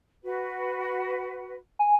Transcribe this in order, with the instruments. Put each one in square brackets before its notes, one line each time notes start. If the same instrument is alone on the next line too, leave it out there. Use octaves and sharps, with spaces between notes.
[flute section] F#4 B4
[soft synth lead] G#5